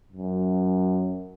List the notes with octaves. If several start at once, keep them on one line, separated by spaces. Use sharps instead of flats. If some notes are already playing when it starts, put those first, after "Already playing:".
F#2